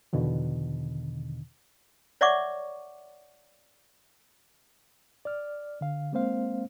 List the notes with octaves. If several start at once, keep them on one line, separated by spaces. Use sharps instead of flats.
E2 B2 D3 D#3
C#5 D5 E5 F#5 C#6 D6
D5 F6
D3 F5
G#3 A#3 C4 C5 F5